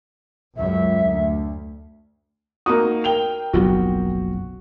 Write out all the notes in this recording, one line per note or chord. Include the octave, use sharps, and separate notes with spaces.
C#2 F#2 E5
D2
A#3 D#4 F#4 A#5 D#6
A#4 G5 F7 G7
F#1 B1 F2 F#4